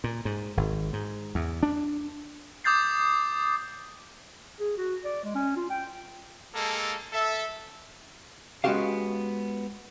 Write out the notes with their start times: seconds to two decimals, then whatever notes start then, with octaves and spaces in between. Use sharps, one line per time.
0.04 A#2
0.25 G#2
0.57 G#1
0.93 G#2
1.35 E2
1.63 D4
2.64 D6 D#6 G6 A6 C7
4.60 G#4
4.78 F#4
5.04 D5
5.24 G#3
5.35 C#4
5.56 F4
5.70 G5
6.55 G#3 A#3 A4
7.13 A4 E5
8.64 G#3 B3 C#4 F#4 G4 F5